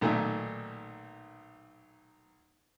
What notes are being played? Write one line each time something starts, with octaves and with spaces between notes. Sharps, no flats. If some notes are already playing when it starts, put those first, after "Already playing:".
B1 A#2 D#3 A3